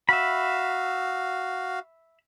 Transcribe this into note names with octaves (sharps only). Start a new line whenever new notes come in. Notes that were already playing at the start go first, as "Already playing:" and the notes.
F#4 E5 F5 B5